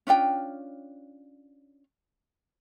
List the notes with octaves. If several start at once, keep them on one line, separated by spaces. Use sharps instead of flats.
C#4 D4 F4 G5